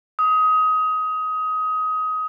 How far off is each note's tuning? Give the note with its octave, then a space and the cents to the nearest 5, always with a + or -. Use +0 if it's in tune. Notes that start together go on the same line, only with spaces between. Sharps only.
D#6 +20